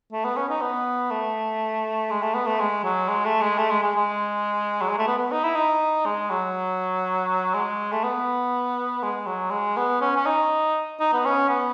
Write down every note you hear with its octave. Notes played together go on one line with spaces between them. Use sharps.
A3
B3
C#4
D#4
B3
A3
G#3
A3
B3
A3
G#3
F#3
G#3
A3
G#3
A3
G#3
G#3
G#3
F#3
G#3
A3
B3
B3
D#4
E4
D#4
G#3
F#3
G#3
A3
B3
G#3
F#3
G#3
B3
C#4
C#4
D#4
D#4
B3
C#4
B3